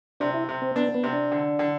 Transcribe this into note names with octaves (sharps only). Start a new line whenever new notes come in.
C3 D4
E4
C3
C4
B3 D4
B3
C3
D4
D3
D3